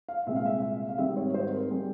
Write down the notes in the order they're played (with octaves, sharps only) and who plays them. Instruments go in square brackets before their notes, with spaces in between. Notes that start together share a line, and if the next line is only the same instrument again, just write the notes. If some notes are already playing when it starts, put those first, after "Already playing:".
[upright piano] F5
C2 A#2 G#3 C4 E5
F5
E5
E5
F5
G#1 G#2 G3 C4 E5
C#5
C5
A#4
G3 C4 G#4